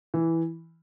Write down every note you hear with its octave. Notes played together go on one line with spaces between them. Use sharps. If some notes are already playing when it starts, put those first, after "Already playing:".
E3